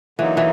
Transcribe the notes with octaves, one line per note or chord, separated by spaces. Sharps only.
D3 E3 F#3 A#3 D#4
E3